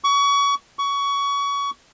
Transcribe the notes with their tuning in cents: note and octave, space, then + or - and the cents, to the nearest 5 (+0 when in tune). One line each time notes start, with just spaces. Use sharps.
C#6 +30
C#6 +25